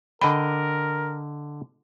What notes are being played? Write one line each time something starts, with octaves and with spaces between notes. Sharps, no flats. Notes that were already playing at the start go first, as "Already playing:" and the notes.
D3 A#4 D#5 G5 B5